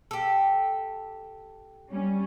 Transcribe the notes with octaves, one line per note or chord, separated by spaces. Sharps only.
G4 A4
G3 C#4